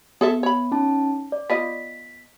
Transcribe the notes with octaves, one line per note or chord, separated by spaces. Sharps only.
B3 G#4 A4 E5
C#5 B5
C#4 D#4 A5
D5
B3 F4 D#5 B6